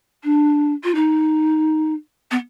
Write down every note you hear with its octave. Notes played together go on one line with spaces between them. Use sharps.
D4
F4
D#4
B3